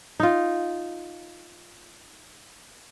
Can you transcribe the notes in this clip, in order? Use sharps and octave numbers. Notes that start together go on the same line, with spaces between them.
D#4 F4